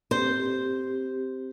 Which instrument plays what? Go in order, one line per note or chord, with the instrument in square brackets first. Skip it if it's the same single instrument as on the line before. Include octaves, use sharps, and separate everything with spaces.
[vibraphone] C4 G4 [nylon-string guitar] C5